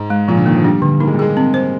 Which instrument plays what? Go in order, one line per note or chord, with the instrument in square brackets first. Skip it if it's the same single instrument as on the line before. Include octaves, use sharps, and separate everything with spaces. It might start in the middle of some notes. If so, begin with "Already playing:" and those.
Already playing: [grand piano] G#2
[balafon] G#3
[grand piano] A#2 [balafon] F3
[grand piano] D3
[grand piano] D#3 [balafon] A#3
[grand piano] F3
[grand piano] G3 [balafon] D4
[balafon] D3
[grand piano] A#3 [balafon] D#4
[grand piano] G#3
G3
[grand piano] G#3 [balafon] G#4
[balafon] C4
C5